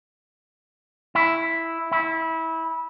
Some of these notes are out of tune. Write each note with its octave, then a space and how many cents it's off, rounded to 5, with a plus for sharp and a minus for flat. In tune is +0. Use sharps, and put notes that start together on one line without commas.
E4 +0
E4 -20